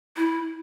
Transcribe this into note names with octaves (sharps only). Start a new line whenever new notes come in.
E4